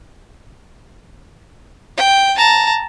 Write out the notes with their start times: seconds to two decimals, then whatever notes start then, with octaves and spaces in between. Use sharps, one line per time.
1.97 G5
2.37 A5 A#5